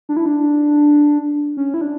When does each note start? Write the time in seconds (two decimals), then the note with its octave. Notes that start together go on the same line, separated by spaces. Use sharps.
0.09 D4
0.17 E4
0.26 D4
1.57 C#4
1.74 E4
1.81 D4